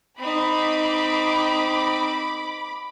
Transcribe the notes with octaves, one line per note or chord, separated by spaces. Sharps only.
C4 D#4 B5 D6